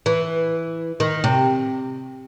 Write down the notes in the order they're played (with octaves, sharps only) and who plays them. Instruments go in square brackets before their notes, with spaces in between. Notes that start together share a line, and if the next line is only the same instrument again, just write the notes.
[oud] E3
D#3
C3